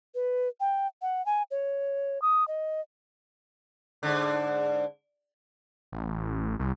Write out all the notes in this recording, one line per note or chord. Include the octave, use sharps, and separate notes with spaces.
B4
G5
F#5
G#5
C#5
D#6
D#5
G#2 D3
A1
C2